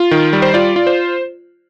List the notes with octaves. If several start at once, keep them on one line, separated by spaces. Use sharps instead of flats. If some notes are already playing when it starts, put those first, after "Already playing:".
Already playing: F4
D#3
G3
C5
F4 D5
F4
C5